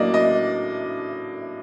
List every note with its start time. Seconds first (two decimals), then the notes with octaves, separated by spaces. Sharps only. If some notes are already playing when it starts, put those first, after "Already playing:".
Already playing: A2 F#3 A#3 D4 D5 D#5
0.14 D#5